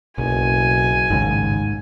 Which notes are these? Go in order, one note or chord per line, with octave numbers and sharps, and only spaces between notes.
F#1 B1 G#5
A1 D#2 G#2 C#3